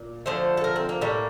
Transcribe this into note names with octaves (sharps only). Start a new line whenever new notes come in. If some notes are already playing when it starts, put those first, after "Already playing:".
Already playing: A#2
D3 F3 A3 C5
A4
A#4
C4
A#3
A2 G3 A#3